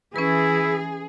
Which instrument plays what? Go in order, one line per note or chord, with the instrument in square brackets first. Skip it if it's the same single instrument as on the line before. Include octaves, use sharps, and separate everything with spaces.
[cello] E3 [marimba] C#4 B4 [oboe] E4 [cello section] G#4